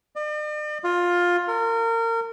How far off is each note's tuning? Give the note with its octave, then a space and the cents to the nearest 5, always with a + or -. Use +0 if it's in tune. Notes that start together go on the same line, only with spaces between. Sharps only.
D5 +45
F4 +15
A#4 -30